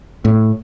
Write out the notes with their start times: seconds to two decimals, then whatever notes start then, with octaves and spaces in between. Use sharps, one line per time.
0.25 A2